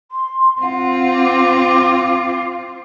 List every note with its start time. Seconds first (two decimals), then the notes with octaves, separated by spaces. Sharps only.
0.11 C6
0.61 C4 F4 F#5
1.12 D6